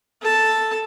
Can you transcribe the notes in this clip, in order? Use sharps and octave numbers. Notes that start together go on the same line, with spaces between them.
A4 A5